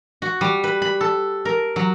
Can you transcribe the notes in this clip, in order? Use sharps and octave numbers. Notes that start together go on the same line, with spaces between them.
F#4
G3
B4
B5
A4
A#4
F#3